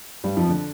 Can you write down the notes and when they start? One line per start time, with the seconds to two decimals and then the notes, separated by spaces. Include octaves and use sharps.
0.24 G2 G3
0.37 F2 F3
0.49 D3